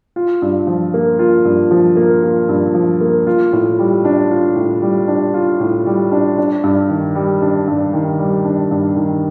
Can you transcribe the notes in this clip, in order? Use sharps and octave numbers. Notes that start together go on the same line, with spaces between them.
F4
G2
F3
A#3
F4
G2
F3
A#3
F4
G2
F3
A#3
F4
A2
G3
D4
F4
A2
G3
D4
F4
A2
G3
D4
D4
G2
D#3
G3
D4
G2
D#3
G3
D4
G2
D#3